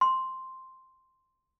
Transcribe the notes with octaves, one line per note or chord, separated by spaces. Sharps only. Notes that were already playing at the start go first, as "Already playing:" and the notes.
C6